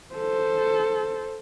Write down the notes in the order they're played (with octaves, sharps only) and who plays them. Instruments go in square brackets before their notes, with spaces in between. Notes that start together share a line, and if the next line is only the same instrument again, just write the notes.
[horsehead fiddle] A4 C5